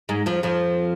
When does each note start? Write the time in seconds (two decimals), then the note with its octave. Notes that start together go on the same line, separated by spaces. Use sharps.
0.09 G#2 G#3
0.26 F2 F3
0.43 F2 F3